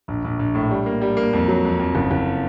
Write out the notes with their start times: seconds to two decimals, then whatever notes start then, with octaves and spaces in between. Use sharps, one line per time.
0.08 A#1
0.24 A#1
0.39 A#1
0.54 A2
0.71 G3
0.86 A#3
1.01 G3
1.17 A#3
1.33 F2
1.48 F#3
1.65 F2
1.79 F2
1.95 F#1
2.11 F#1